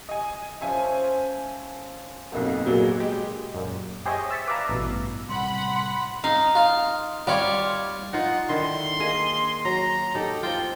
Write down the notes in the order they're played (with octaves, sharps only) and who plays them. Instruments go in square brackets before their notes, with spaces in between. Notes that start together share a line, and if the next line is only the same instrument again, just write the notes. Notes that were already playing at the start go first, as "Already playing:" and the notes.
[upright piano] D#5 G#5
[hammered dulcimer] F3 C#4 C5 [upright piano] E5 G#5
[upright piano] B1 F2 A#3 [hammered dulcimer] B2
[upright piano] A#2 D3 F#3 [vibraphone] F#4 G#4
[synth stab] G#3 G4
F#2 A#2
G4 G#4 C5 C#5 D#5 E5
E6 A6 B6 C#7
B4 D5 E5 F5 A5 A#5
A1 G2 B2
[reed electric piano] A2 C3 G3 [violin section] F#5 B5 [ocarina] C6
[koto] D#4 F5
[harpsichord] F4
[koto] G3 C#5 [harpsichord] F4 D5
[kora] D#4 F4 [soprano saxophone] F#5
[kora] D3 D#3 E4 [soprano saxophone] C6
[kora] A#3 G#4 D#5
[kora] F#3 [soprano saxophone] A#5
[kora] D#4 G4 [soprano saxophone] A4
[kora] C4 F4 [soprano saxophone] G5